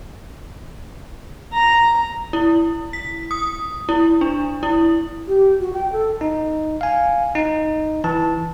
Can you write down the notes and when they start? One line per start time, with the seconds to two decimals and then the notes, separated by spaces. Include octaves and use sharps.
1.53 A#5
2.33 E4
2.93 B6
3.31 D#6
3.89 E4
4.21 D4
4.63 E4
5.28 G4
5.60 F#4
5.73 G5
5.92 A4
6.21 D#4
6.81 F5 G#5
7.35 D#4
8.04 E3 A5